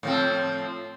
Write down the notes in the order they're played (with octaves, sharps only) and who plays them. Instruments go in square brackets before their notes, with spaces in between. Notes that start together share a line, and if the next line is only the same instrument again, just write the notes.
[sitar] A2 F3 C4